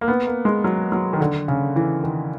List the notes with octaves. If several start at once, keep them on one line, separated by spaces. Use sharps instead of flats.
A#3
B3
A#3
G#3
F#3
F#3
D#3
D3
C#3
E3
D#3